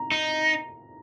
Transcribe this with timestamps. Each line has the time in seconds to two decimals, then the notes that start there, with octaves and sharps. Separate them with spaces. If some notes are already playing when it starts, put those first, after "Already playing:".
Already playing: A#5
0.12 D#4